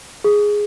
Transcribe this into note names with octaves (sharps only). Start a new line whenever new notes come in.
G#4